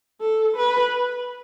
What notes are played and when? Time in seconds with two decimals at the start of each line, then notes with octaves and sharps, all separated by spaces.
0.21 A4
0.56 B4